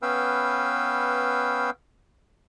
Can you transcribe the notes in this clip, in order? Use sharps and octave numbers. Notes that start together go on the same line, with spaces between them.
B3 C#4 B4 F5 G5 E6